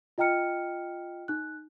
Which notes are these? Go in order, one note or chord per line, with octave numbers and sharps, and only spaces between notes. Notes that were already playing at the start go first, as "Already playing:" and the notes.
F4 D#5 G5 A#5 F6 C#7
D#4 F#6